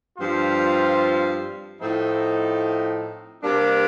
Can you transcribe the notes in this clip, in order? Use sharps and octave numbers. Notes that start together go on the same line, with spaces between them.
G2 F3 C4 F4
A2 F3 A3 C4 D#4
C3 G3 A#3 D4